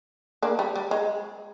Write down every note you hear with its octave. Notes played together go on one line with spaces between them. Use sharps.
A#3 D4
G3
G3
G#3